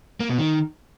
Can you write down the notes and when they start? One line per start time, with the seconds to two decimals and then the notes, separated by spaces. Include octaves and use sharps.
0.20 A#3
0.29 B2
0.39 D#3